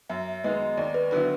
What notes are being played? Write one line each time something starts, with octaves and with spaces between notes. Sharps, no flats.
F#2 E5
D#3 G#3 B3 D#5
D#2 D5
B4
D3 F#3 B3 E4 B4